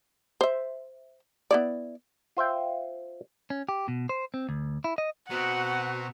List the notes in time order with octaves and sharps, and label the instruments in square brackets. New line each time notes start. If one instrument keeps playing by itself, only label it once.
[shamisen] C5 E5
B3 E4 D5
[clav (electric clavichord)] F4 C5 E5 G5
[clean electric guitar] C#4
G4
B2
C5
C4
D2
E4
D#5
[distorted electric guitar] B2 [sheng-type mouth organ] C4 A#5 C#6 [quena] F#4 [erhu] F#5